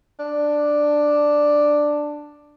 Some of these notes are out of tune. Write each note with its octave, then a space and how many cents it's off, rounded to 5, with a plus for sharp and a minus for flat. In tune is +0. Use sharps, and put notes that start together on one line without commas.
D4 +5